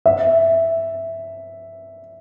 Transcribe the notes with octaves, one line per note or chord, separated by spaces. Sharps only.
E5